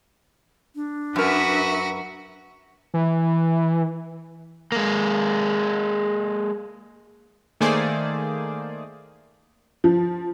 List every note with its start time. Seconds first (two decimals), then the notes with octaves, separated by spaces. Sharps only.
0.75 D4
1.16 F#2 F#4 A#4 B4 E5
2.94 E3
4.72 G#3 A#3
7.60 D#3 A3 A#3 G#4 C5 D5
9.84 F3